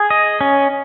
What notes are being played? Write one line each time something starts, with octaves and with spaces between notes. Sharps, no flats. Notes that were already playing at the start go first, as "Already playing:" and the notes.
Already playing: G#4
D#5
C#4